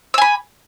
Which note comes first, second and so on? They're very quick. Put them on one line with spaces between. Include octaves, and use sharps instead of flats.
E6 G#5 B5